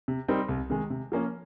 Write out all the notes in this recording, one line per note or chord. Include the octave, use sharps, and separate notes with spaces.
C3
G3 C4 D#4 A#4
C2
C3 D#3 G#3
C3
F3 A#3 C#4